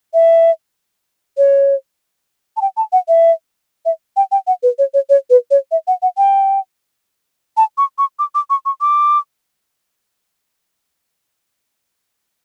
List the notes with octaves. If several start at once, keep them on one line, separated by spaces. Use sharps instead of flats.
E5
C#5
A5
G5
A5
F#5
E5
E5
G5
G5
F#5
B4
C#5
C#5
C#5
B4
C#5
E5
F#5
F#5
G5
A5
C#6
C#6
D6
D6
C#6
C#6
D6